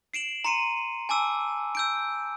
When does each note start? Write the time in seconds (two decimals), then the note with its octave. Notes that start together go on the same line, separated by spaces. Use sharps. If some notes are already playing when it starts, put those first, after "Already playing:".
0.14 C7 D7 E7 F#7
0.45 A#5 C6 C#7 D#7
1.09 G#5 A5 D6 E6
1.75 E6 G6 D7